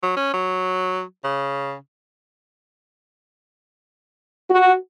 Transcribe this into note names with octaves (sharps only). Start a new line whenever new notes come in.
F#3
C#4
F#3
C#3
F#4